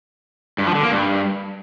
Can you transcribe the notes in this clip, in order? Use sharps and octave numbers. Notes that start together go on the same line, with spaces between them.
G2
F3
D3
A#3
G2